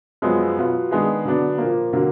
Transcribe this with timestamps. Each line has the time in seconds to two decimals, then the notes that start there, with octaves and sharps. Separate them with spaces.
0.22 F#2 F3 G#3 B3
0.57 B2 F#3 B3 F4
0.91 D#3 G#3 B3 D4 G#4
1.25 D3 F#3 B3 D4
1.58 A#2 F3 A#3
1.93 D3 F#3 A#3